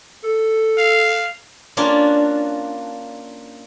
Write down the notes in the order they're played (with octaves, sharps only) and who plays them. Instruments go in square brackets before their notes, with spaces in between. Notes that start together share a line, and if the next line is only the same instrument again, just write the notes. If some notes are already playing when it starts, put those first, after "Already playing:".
[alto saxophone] A4
[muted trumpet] F5
[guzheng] A#3 C#4 D4 F4